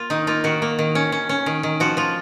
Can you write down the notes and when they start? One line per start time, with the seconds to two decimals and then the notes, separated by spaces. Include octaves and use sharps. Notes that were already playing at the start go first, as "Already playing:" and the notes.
Already playing: A#3 F4
0.10 D#3 D#4
0.27 A#3 F4
0.44 D#3 F#4
0.62 A#3
0.79 D#3
0.95 C#4
1.12 C#4
1.29 C#4
1.46 D#3
1.63 D#3
1.80 F3 F#4
1.97 F3 F4